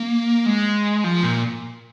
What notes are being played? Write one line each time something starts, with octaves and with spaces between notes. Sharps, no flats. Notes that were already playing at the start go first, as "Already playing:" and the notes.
Already playing: A#3
G#3
F3
A#2